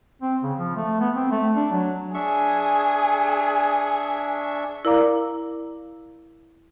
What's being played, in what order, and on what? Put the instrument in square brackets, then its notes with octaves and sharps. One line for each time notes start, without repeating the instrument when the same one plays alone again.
[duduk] C4
C#3
F3
A3
B3
C4
A3
D4
F#3
[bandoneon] D4 E5 C#6 [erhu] G#4
[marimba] E4 A#4 D5 F5 A#5 D6